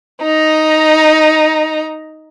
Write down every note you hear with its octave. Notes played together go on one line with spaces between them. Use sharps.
D#4 A#5